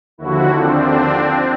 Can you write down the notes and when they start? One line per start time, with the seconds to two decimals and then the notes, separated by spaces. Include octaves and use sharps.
0.18 D#2 D3 F3 E4 F#4
0.50 C4 D4